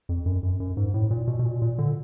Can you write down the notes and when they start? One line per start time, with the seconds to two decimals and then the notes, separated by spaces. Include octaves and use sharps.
0.09 F2
0.26 F#2
0.43 F#2
0.60 F#2
0.77 G#2
0.94 A2
1.11 A#2
1.27 B2
1.39 B2
1.45 A#2
1.62 A#2
1.78 D3